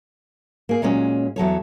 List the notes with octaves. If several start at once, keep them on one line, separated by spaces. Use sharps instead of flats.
A#3 G#4
A#2 F#3 G#3 C#4
E2 F#3 A4 C#5